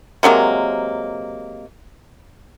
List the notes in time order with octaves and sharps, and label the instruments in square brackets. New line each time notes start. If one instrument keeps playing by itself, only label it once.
[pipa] C3 F#3 G#3 A#3